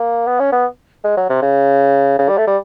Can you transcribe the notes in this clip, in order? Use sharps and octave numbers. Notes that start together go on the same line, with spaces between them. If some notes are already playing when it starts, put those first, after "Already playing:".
Already playing: A#3
B3
C#4
B3
G#3
F#3
C3
C#3
C#3
G3
A3
G3